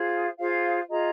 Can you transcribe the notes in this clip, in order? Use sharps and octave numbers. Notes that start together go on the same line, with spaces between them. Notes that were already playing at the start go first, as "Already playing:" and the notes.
Already playing: F4 G#4 C5 F5
F4 G#4 C5 F5
F4 G#4 D#5 A#5